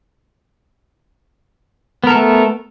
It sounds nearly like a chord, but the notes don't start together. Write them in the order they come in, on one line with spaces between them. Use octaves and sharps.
B3 A#4 A4 A3